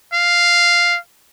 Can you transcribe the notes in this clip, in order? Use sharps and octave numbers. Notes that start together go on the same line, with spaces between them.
F5